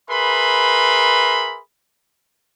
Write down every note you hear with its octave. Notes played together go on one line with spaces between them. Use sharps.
G#4 A#4 B4 E5 B5 C6